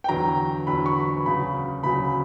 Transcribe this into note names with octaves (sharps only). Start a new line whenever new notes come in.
G5
E2 D3 F#3 A#5
E2 D3 F#3 B5
C#6
B5
D2 C#3 F#3 B5
D2 C#3 F#3 B5